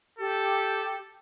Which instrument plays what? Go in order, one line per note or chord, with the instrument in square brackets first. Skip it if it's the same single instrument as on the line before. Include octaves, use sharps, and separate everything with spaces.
[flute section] G4 [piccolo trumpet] A4